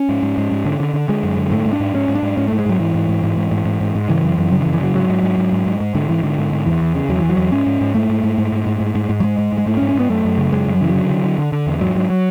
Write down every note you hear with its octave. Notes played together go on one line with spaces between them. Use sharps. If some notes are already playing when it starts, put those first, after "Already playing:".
Already playing: C#4
G#2
G#2
G#2
G#2
D3
D3
D3
D3 G#3
F#2
D3
G#2 A3
G#2
D4
G#2
G#2 C#4
G#2
D4
G#2
G#2 C#4
G#2 A3
G#3
G#2 F#3
G#2 E3
G#2
G#2
G#2
G#2
G#2
G#2
G#2
G#2
C#3 E3
F#2
F#2
C#3 F#3
D3
E3
F#2
E3
C#3 F#3
G#2 F#3
G#2
G#2
G#2
G#2
G#2
G#2
G#2 D3
G#2 E3
G#2 D3
G#2
G#2
E2 E3
E2
C#3
E2 F#3
E2 E3
F#3
E2
G#2 C#4
G#2
G#2
G#2 A3
G#2
G#2
G#2
G#2
G#2
G#2
G#2
G#2
F#3
G#2 G#3
G#2
G#2
G#3
G#2 A3
C#4
G#2
C#4
G#2 B3
F#2 A3
F#2
C#3
F#2 G#3
F#2
F#3
C#3 E3
F#3
D3
D3
D3
D3
D3
E2
G#2 F#3
G#2 F#3
F#3